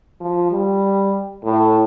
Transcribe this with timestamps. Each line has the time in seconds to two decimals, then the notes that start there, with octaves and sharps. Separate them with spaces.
0.21 F3
0.52 G3
1.44 A2